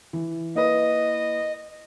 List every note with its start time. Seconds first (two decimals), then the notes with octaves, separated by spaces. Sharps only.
0.13 E3
0.55 A#3 E4 B4 D#5